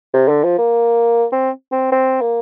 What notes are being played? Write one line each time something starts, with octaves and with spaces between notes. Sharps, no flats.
C3
D3
F3
A#3
C4
C4
C4
A#3